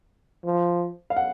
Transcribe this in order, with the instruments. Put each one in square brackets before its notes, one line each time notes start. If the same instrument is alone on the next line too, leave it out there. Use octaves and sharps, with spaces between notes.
[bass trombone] F3
[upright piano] F5
F#5